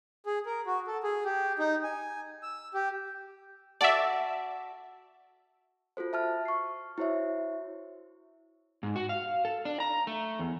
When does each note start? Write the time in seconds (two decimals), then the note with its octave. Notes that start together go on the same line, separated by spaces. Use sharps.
0.26 G#4
0.46 A#4
0.66 F#4
0.87 A4
1.03 G#4
1.25 G4
1.59 D#4
1.83 G#5
2.43 E6
2.74 G4
3.81 F#4 A4 D5 E5
5.97 F4 F#4 A4 C5
6.13 E5 A5 F6
6.45 C#6 C7
6.98 E4 F#4 C5 C#5 E5
8.83 G#2
8.96 F#4
9.09 F5
9.45 A4
9.65 D4
9.80 A#5
10.07 A3
10.39 E2